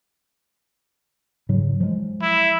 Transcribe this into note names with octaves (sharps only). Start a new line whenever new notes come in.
G#2 C#3 F#3
F3 F#3 G#3
E4